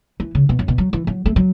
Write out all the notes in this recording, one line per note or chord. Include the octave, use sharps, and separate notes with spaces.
E3
C#3
B2
F#2
B2
F#3
E3
F#3
A3
F#3